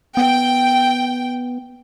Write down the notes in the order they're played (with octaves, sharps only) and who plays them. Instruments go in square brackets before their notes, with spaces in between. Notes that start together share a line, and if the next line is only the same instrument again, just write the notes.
[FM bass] B3 [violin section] G5